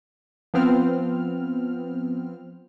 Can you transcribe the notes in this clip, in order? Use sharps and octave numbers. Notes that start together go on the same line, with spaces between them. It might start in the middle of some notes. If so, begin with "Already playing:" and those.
F3 B3 C4 F6